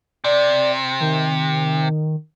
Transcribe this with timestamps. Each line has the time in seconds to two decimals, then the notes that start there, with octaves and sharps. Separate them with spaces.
0.24 C3 D5
1.00 D#3